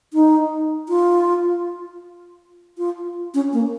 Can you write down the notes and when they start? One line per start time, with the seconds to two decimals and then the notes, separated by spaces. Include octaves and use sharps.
0.13 D#4
0.89 F4
2.78 F4
3.34 C#4
3.53 A#3